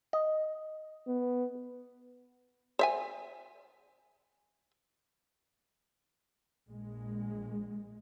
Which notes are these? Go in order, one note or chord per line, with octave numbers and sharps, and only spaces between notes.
D#5
B3
C5 E5 G#5
A#1 G#3